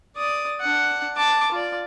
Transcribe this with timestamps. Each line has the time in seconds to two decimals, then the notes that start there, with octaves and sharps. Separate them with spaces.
0.17 D5 D#6
0.61 D4 F#5
1.17 A5 D6
1.52 F4 D5